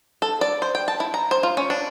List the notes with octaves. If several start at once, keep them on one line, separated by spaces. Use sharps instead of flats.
A4
D5
C5
G5
A5
E4
A#5
C5
F4
C#4
D4